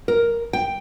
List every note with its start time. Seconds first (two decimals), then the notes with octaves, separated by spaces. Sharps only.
0.08 A#4
0.53 G5